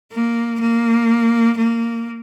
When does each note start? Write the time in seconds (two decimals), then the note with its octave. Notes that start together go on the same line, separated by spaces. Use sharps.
0.12 A#3
0.60 A#3
1.57 A#3